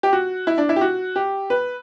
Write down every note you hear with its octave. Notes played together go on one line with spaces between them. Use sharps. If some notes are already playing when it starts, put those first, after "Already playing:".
G4
F#4
E4
D4
E4
G4
F#4
G4
B4